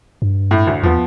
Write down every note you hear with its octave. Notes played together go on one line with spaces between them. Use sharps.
G2
A2
D2
E2 F3 B3